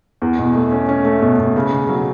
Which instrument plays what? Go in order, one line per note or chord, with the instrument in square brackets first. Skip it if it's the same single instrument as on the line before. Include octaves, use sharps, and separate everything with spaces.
[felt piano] E2
B2
A3
C#4
C#4
A3
B2
B2
C#3
C#3
F#3